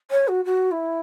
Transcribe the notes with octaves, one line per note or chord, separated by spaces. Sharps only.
C#5
F#4
F#4
E4